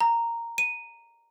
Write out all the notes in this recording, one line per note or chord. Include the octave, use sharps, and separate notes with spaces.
A#5
D#7